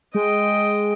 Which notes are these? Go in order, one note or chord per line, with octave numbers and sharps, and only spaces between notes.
G#3 D#5 G5